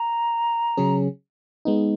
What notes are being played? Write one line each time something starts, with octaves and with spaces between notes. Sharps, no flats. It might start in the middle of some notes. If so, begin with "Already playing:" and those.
Already playing: A#5
C#3 F#3 C#4 G#4
G#3 B3 D#4